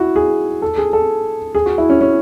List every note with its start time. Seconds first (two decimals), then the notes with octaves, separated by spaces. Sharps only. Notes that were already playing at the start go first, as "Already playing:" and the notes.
Already playing: E4 F#4
0.16 G#4
0.62 A4
0.78 G#4
0.93 A4
1.55 G#4
1.66 F#4
1.78 E4
1.89 C#4
2.01 C#4